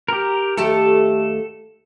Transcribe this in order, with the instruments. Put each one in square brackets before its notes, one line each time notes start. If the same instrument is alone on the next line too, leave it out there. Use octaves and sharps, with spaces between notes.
[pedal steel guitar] G4 A#4
[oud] D#2 A3 G4 [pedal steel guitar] A4